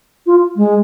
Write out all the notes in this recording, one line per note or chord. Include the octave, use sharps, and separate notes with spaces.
F4
G#3